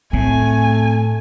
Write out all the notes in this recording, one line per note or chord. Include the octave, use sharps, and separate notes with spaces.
A2 A3 C4 G#5